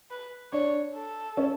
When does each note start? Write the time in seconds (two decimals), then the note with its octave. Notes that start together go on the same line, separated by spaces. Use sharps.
0.11 B4
0.53 D4 C#5
0.95 A4
1.37 C#4